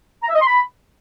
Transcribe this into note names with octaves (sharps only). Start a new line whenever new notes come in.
A#5
E5
D#5
C6
B5